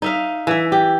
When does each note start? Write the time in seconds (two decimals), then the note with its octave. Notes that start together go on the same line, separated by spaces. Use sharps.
0.02 D#4 E5 F5
0.47 E3 E5
0.72 G4